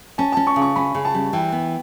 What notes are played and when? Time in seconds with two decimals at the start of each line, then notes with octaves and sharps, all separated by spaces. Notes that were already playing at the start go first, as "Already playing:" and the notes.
0.18 C#4 A5
0.32 C#4 A5
0.47 C#6
0.56 C#3
0.62 C#6
0.76 C#4 B5
0.95 C#3
1.05 A5
1.15 G3
1.33 E3 G5
1.52 B3